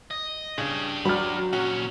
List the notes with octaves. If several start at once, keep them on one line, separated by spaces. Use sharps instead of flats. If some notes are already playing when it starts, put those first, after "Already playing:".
D#5
C#3 D4 G4
F#3 D5 B5 F6
A#2 C#4 F#4